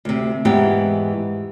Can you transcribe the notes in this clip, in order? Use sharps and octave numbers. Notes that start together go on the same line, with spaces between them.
D2 C3
E2 G#2 E3 B3 G4